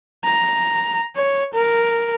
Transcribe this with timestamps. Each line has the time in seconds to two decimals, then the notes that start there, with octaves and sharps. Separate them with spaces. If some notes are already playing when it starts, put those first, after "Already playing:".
0.25 A#5
1.16 C#5
1.54 A#4